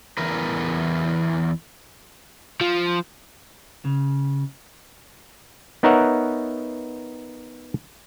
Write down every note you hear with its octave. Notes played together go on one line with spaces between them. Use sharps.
E2 E3 A#4 B4
F3
C#3
B3 D#4 A#4 C#5 E5 F#5